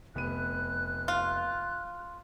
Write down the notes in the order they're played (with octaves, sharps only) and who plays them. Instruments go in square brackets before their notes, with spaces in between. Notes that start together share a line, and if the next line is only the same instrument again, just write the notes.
[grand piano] F1 B3 D#7 [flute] F#6
[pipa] F4